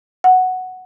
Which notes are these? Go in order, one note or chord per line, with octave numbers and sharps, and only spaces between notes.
F#5